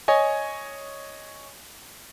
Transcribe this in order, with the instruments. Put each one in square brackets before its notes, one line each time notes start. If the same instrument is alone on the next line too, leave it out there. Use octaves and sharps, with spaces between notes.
[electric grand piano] C#5 D#5 G#5